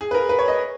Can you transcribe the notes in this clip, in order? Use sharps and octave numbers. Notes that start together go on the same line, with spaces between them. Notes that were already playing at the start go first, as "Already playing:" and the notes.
G#4
B4
A#4
B4
C#5
D#5